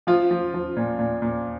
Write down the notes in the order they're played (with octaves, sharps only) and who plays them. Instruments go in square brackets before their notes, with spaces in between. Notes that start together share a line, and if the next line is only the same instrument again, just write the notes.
[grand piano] F3 F4
F3
F3
A#2
A#2
A#2